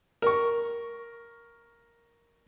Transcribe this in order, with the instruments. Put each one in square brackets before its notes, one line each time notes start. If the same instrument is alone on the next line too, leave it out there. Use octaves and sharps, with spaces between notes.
[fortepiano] A#4 C#6